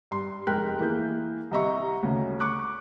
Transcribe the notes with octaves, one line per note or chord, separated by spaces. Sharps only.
G2 C6
F1 G#3 A#4 G5 F#6 B6
E3 A#3 G#4 G6
C2 C3 D#5 E5 A#5 C#6
D2 C#3
C#6 D6 F#6